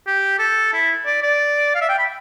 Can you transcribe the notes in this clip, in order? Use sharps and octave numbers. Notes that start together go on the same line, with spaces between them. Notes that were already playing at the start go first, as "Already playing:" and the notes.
G4
A4
E4
D5
D5
F5
E5
G5
B5